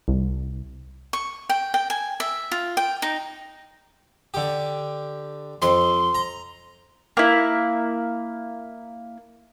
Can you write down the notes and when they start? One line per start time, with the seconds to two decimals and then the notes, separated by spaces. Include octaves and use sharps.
0.08 C2
1.13 C#6
1.49 G5
1.74 G5
1.90 G#5
2.20 E5
2.52 F4
2.77 G5
3.02 D#4
4.34 D3 G4
5.62 F2 C6
6.15 A#5
7.17 A#3 E4